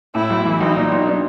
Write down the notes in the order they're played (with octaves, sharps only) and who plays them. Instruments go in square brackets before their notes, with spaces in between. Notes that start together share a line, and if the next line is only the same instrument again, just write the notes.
[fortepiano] A2 [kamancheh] E4
[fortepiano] B1
E3
[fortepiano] B1 [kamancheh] D#4
[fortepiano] A#2
B1
D4